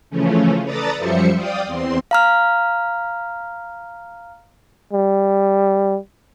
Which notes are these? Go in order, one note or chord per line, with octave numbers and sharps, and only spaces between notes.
C#3 E3 F3 A3 C#4
A4 B4 D5 A#5 D#6 A6
F#2 F3 G3 C5 E5 C#7
D5 F5 G5 D#6
E2 C4 C6
F5 A#5 F6
G3